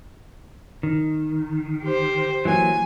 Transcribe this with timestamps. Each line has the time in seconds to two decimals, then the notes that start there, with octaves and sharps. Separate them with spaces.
0.83 D#3
1.84 G4 C5
2.45 E3 F#3 A#3 G#5